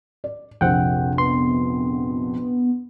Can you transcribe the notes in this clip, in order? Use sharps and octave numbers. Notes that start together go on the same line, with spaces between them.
D5
A#1 F2 C3 C4 F#5 G5
B3 C6